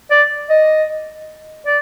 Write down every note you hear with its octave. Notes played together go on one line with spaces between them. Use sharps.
D5
D#5
D5